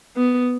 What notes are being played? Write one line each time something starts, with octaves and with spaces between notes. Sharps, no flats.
B3